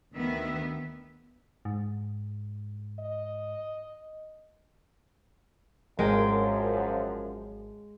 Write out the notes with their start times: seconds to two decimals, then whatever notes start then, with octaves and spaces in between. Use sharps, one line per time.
0.14 D2 D#3 B3 E5
1.65 G#2
2.99 D#5
5.99 G#1 F#2 F3 G#3 A#4 G5